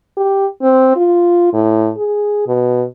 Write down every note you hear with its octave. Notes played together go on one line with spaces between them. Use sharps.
G4
C4
F4
A2
G#4
B2